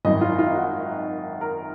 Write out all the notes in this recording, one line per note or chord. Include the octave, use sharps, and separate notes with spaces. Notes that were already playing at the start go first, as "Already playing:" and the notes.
G#1 F#2 D#3 D#5
F4
F4
F#4
A#4